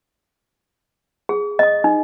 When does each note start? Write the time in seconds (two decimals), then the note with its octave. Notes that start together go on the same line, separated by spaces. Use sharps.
1.29 G#4
1.59 D#5 D#6
1.84 D#4